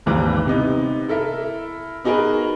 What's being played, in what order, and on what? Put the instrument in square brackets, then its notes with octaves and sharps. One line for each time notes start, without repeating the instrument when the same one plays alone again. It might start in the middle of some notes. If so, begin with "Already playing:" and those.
[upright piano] G#1 D#2 E3 G3 A#5
C3 B3 D#4
E4 A4 A#4 E5
B3 D#4 F#4 G#4 A#4 B4